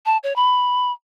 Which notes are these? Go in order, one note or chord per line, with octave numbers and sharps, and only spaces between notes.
A5
C#5
B5